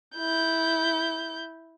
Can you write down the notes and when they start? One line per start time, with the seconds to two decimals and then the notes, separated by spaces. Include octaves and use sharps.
0.17 E4 G6